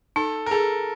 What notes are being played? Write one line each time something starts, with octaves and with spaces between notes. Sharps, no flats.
D#4 A4
A#4
G#4 A4